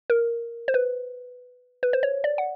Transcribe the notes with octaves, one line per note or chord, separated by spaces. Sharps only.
A#4
C5
B4
B4
C5
C#5
D5
F#5